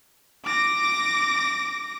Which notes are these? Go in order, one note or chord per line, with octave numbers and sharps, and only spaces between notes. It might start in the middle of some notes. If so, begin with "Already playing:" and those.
D6 A#6